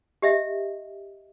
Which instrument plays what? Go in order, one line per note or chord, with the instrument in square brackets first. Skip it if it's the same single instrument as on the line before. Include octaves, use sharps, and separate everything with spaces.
[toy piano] G4 D#5 E5